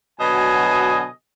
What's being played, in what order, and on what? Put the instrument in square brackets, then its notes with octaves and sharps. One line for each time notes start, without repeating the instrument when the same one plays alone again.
[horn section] B2 D3 F#3 D#5 G#5